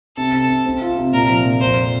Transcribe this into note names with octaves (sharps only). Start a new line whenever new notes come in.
C3 A4
C3
C3
C4
F4
C3
A#2 A#4
F3
A#2
F2 C5